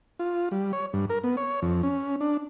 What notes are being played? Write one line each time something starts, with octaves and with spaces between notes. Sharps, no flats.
F4
G3
C#5
G2
A#4
B3
C#5
F2
C#4
D4